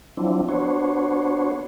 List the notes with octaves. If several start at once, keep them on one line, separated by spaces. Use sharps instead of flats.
F3 F#3 C4 D4 E4
B3 D4 F#4 C5 C#5